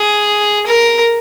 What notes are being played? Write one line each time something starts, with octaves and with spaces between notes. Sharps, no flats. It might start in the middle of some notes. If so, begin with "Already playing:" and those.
Already playing: G#4
A#4